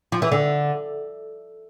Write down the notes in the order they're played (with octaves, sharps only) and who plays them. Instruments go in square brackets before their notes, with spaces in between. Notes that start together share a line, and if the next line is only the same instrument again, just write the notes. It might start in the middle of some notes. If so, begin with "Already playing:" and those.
[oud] F3
E3
D3